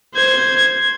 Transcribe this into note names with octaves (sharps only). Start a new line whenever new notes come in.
C5 G#6